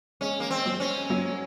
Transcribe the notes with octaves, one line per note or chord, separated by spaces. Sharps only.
G#3 C#4
A#3
C4
F#3
C#4
F#3